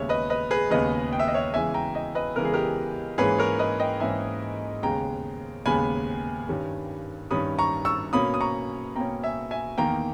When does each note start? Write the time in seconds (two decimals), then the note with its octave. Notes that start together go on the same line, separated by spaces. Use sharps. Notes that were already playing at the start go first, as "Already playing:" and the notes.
Already playing: D#2 C#3 G#3 B3 C#5 E5
0.09 B4 D#5
0.30 B4 D#5
0.51 G#4 B4
0.70 D#2 C#3 G#3 B3 B4 D#5
1.13 G5
1.19 E5
1.28 D#5
1.34 C#5 E5
1.53 E2 C#3 E3 G#3 E5 G#5
1.74 G5 A#5
1.94 D#5 G5
2.15 B4 D#5
2.36 E2 C#3 E3 G#3 A#4
2.45 G#4
2.53 G4 A#4
3.18 G#2 E3 A#3 C#4 G#4 B4
3.38 A#4 C#5
3.59 B4 D#5
3.80 D#5 G5
4.00 G#2 E3 A#3 C#4 E5 G#5
4.83 D#2 C#3 G#3 B3 G5 A#5
5.66 D#2 C#3 G#3 B3 G#5 B5
6.49 G2 D#3 G3 C#4
7.31 G2 D#3 G3 C#4 B5 D#6
7.59 A#5 C#6
7.85 C#6 E6
8.13 B2 A#3 C#4 B5 D#6
8.34 D#6
8.41 A#5 C#6
8.96 B2 A#3 C#4 G5 A#5
9.23 E5 G#5
9.51 E5 G#5
9.77 E2 D#3 A#3 G5 A#5